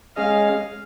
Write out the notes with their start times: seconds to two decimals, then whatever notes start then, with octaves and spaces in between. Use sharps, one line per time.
0.16 G#3 C#4 G#4 D#5 F5